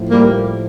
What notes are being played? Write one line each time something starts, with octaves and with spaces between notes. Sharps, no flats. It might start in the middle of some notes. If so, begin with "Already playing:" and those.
Already playing: A2 F3
G3 A#3